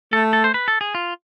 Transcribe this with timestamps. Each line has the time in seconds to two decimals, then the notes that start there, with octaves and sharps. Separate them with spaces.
0.13 A3 A4
0.33 A4
0.44 C5
0.54 B4
0.68 A4
0.81 G#4
0.95 F4